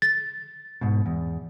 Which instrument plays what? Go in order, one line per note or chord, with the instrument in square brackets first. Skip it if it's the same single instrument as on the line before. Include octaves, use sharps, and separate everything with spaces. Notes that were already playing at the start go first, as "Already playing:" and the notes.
[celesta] A6
[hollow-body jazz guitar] G#2 B2
E2